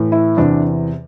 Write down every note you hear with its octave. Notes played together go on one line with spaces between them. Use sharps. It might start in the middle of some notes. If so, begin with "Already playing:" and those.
Already playing: A2 E3
E4
E2 C3 E3 D4